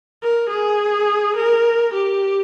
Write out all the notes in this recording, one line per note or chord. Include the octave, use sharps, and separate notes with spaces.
A#4
G#4
A#4
G4